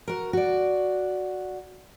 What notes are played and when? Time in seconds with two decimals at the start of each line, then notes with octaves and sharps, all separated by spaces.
0.08 F#4 A#4
0.33 F#4 D5